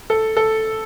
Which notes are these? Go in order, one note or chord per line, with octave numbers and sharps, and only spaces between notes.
A4
A4